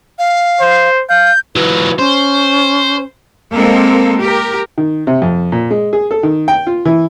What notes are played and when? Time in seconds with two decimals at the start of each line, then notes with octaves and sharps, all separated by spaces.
0.19 F5
0.60 C5
1.09 F5 G6
1.56 E3 F#3 B4
1.99 C#4 C5
3.53 G#3 A#3 C4 A4
4.19 G4 A#4
4.78 D#3
5.07 C3
5.22 F2
5.52 A#2
5.71 G#3
5.93 G#4
6.11 A4
6.23 D#3
6.48 G5
6.67 F4
6.85 E3